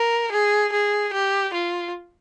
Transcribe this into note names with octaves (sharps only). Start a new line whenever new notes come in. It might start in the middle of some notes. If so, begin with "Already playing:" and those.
Already playing: A#4
G#4
G#4
G4
F4